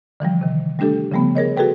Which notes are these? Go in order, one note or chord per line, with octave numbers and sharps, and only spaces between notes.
D3 E3 F3 G3
C3 D#3
G3 A3 D4 G4 A4
C#3 F3 G3 A3 B3
G#4 A#4 C#5 D#5
F#4 G#4 A4 B4 G5